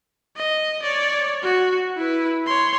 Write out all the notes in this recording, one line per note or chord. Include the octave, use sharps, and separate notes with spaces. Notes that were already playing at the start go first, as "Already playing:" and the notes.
D#5
C#5 D5
F#4
E4 B4
C#5 C6